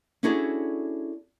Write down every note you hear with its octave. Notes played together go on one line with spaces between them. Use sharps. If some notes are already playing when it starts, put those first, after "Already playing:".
C#4 D4 E4 F#4 G#4 A4